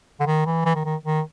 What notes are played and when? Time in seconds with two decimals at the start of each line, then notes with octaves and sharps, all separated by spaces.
0.20 D3
0.26 D#3
0.46 E3
0.65 E3
0.75 D#3
0.85 D#3
1.04 D#3